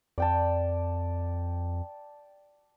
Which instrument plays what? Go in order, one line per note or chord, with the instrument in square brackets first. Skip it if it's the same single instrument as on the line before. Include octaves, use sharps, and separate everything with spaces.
[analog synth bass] F2 [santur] D5 G5 A5